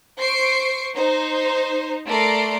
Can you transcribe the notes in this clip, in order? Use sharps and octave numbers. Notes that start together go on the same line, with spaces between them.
C5 C#6 C7 D7
D#4 C5
A3 A#4 D5 C6 C7 D7